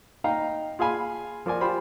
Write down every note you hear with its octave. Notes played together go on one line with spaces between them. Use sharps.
D#4 F5 G5 A#5
F4 G#4 F5 G#5 B5
F3 A#4 D5 G#5
F4 G4 C5 B5